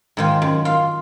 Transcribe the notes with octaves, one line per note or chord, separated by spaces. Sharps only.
G#2 D#3 F4
F#2
F4 F5